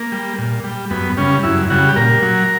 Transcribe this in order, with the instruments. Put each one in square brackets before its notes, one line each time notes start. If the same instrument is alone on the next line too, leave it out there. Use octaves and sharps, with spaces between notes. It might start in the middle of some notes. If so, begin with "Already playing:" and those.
Already playing: [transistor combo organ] A#3
G3
A#2
G3
F#2 B3
C#3 G3 C#4
F#2 E4
C#3 G3 F#4
G4
A#2 A#4
F#3